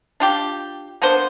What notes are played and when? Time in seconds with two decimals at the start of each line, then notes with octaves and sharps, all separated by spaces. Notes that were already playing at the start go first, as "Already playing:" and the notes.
0.20 D4 F4 G4
1.02 A#3 B3 D4 C5